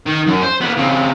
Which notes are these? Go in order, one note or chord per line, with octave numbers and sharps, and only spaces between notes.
D#3
F#2
C5
A#3 B3
C#3 C4